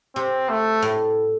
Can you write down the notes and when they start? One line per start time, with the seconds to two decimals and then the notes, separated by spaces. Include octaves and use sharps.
0.16 C3 C4
0.49 A3
0.82 A2